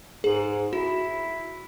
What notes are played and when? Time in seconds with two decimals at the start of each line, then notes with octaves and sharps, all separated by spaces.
0.24 G#2 G#4
0.73 E4 F#4